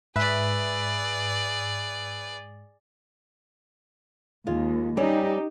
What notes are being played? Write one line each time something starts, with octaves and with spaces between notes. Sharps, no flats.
G#2 G#4 B4 D5 E5
D#2 G#3 F4
G3 C4 C#4 D#4 G4